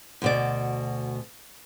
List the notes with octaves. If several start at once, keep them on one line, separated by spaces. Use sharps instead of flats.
D2 B2 D5